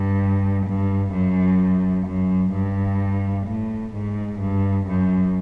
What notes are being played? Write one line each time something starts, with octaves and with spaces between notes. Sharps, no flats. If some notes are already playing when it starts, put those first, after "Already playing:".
Already playing: G2
G2
F#2
F#2
G2
A2
G#2
G2
F#2